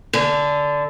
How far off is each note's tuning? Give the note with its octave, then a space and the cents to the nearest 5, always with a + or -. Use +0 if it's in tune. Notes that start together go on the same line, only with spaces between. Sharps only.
D3 -10